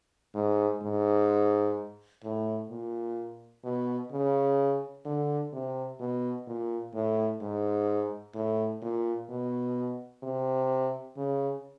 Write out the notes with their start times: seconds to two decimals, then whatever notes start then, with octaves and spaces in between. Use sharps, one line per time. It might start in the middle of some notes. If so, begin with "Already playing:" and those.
0.35 G#2
0.82 G#2
2.24 A2
2.70 A#2
3.64 B2
4.12 C#3
5.05 D3
5.53 C3
6.00 B2
6.47 A#2
6.94 A2
7.41 G#2
8.34 A2
8.82 A#2
9.29 B2
10.23 C3
11.17 C#3